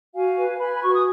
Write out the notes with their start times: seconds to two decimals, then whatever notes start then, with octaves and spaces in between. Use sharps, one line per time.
0.15 F#4 F5 G#5
0.37 B4
0.59 B4 G#5 B5
0.74 B5
0.82 F#4 C#6
0.94 D#6